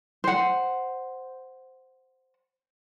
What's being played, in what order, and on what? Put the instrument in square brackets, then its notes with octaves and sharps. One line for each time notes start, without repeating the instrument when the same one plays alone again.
[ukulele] C5 F#5